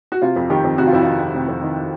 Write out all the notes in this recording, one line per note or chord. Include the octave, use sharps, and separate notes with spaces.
F#4
C3 F4
F2
D#3 G4
F2
C3 F#4
F4
F2 E4
D#3 F4
F2
C3
F2
D#3